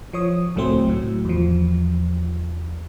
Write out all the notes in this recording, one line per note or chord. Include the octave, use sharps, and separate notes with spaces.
F3 C#5 D#6
C#2 A2 F#3 A3 C4 C5
A2 F#3
E2 F3